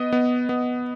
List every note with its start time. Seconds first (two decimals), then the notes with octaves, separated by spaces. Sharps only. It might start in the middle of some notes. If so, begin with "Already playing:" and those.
Already playing: B3 D#5 D#6
0.12 B3
0.49 B3